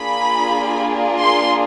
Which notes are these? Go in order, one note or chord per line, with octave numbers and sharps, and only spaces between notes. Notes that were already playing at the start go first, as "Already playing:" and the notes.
Already playing: A#3 D4 F4 G#4 B5
C6